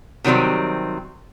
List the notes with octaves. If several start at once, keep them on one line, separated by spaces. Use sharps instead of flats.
C3 D#3 F#3 G3 C4